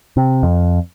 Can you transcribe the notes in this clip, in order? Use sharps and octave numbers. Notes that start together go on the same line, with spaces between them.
C3
F2